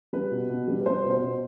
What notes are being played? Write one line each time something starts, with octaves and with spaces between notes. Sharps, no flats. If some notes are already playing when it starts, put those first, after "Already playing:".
G3 B4
B2
B2
G3
B4
G3 C5
B2
C5
B2